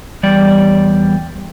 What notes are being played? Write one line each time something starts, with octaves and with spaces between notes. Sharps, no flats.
E2 G3 D5